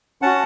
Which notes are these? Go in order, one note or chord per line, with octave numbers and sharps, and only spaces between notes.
C#4 F#4 F#5 A5